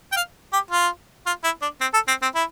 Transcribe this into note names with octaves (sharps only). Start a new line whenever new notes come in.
G5
F5
G4
F4
F4
E4
D4
C4
A4
C4
C4
E4